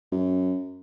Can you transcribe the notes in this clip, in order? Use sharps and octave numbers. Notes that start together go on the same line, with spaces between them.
F#2